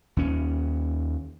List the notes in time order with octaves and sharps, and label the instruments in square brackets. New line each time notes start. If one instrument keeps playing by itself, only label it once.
[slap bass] D#2 C#4